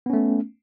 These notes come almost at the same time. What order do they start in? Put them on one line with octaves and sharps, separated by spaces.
B3 C#4 A3